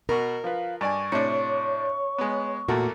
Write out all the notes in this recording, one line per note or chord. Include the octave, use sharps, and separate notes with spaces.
B2 F#4 A#4
F3 B4 F5
G2 D5 G#5 C#6
A2 C3 D4 C#5
G#3 B3
E2 A#2 A3 A#3 F#4